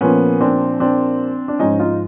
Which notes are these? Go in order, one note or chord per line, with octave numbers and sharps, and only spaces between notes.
A#2 F3 A#3 B3 C#4
C4 D4
C4 D4
D4
G#2 F3 G#3 C#4 D#4
D#4 F4